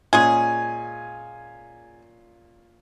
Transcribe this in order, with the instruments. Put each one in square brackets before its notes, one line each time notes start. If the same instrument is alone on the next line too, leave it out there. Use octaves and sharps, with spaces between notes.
[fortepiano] A#2 C#4 [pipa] G#3 G#4 [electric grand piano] G#5